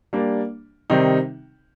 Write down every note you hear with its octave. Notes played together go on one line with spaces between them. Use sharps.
G3 A#3 D4
C3 D#3 G3 C4 D#4